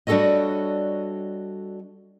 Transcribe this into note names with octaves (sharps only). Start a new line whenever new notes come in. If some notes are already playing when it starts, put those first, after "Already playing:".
G3 D4 F#4 A4 C#5 D#5